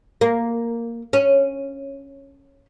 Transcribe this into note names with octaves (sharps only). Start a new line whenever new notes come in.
A#3
C#4